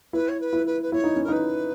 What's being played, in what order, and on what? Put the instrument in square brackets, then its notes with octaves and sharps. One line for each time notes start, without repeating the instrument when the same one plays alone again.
[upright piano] E4 [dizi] B4
[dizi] C#5
B4
[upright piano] E4
[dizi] B4
B4
[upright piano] E4 [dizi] C#5
[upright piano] D#4
C#4
[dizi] A#4
[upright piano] D#4 [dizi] B4